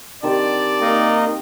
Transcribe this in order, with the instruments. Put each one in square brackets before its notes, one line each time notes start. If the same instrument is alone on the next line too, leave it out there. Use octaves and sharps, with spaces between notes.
[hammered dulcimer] D#3 C4 G4 [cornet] D5 [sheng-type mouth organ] A5
[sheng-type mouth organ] A#3 D#4 D#5